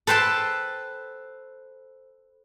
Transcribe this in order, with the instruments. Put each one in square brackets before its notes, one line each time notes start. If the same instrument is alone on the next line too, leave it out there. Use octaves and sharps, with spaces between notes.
[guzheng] A4 B4 C5 G5 A5